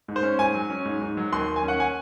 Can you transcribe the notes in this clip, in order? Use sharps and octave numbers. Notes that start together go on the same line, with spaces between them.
G#2
C5
C#4
G#2 G#5
F#3
C#4
G#2
G#2
F#3
D#2 C6
D#2
G#5
C#4
F#5
G#5